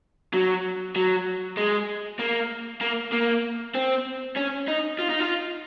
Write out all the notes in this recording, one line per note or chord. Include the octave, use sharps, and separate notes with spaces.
F#3
F#3
G#3
A#3
A#3
A#3
C4
C#4
D#4
F4
D#4
F4